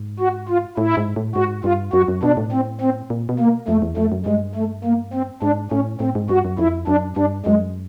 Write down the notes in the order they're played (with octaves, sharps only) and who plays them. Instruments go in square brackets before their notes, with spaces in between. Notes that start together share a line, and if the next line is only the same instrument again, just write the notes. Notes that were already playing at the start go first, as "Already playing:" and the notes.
Already playing: [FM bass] G#2
[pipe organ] F#4
F4
[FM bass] A2 [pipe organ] E4
[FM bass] G#2
A2
[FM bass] G#2 [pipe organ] F#4
[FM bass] G2 [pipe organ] F4
[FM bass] F#2 [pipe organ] F#4
[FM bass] F#2
[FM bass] B2 [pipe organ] D4
[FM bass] A2
[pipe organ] C4
C4
[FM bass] A#2
B2
[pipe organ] A#3
[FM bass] F2 [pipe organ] A3
[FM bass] E2
[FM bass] F2 [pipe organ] A3
[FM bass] F#2
[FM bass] G2 [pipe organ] G#3
[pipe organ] A3
A#3
C4
[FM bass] G#2 [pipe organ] D4
[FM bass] A2 [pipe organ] C#4
[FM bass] A2 [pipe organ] C4
[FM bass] G#2
[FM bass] G2 [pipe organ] F#4
[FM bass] F#2
[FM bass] F2 [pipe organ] E4
[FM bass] F#2 [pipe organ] D4
[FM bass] G2 [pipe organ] D4
[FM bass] F#2 [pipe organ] G#3